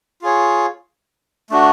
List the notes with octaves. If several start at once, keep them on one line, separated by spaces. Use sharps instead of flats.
F4 G#4 C#5
A3 D4 F#4